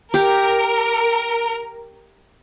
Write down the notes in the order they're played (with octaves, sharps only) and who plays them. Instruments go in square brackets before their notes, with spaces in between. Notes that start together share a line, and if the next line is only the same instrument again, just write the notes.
[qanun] G4 [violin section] A#4